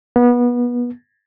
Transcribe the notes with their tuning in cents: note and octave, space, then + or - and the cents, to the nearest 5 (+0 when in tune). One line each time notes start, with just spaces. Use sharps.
B3 -25